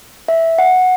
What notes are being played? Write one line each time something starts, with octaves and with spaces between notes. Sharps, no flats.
E5
F#5